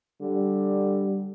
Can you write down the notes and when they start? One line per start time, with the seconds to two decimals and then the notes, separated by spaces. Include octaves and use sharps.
0.21 D3 G3